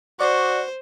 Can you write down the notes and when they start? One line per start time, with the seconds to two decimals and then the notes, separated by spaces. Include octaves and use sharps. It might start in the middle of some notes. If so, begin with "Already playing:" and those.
0.20 F#4 C5 D5 C#6